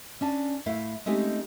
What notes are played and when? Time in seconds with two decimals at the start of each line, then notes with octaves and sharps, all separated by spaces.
0.21 C#4 D4 A5
0.66 A2 A3 E4 F5
1.06 G#3 A3 C4 C#4 D#4 G4